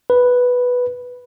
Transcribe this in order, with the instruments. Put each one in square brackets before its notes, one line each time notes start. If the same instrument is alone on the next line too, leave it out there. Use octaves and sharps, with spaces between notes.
[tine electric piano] B4